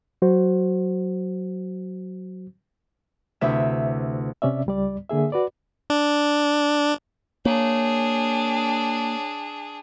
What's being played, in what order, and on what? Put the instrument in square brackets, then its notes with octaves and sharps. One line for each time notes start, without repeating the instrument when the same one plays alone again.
[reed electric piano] F#3 F#4 C5
[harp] D2 C3 E4 B4 E5 E6
[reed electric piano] C3 C#4 D5 E5
C#2 G3 D5
D3 A#3 G#4 E5
F#4 B4 D5
[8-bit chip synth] D4
[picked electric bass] A#3 [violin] D4 G#4 [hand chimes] C#5